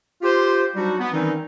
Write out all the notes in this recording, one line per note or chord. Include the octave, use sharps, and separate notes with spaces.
F4 G4 C5
F#3 G3 D4 D#4 F#4
B3
D#3 E3 G3 C4 C#4 D#4